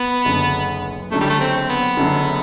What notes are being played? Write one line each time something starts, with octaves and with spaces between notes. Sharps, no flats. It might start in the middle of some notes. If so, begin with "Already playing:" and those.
Already playing: B3
F#1 F#2 D3
F#1 F#2 D3 A3
G3
A3
C4
B3
F#1 F#2 D3